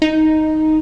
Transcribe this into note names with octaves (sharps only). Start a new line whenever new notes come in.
D#4